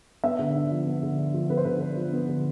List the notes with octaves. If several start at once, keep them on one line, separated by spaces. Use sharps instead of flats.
B3 E5
D3
D4
F3
B3
D3
D4
F3
B3 B4
C5
D3 B4
D4
F3
B3
D3